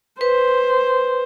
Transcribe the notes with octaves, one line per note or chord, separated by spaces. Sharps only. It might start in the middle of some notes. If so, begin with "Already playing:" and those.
B4 C5